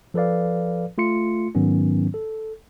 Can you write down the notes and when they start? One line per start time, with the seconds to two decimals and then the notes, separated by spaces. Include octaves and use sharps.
0.14 F3 A4 B4 D5 F5
0.98 A3 F4 C6 C#7
1.55 G#2 D#3 F#3 B3 C#4
2.14 A4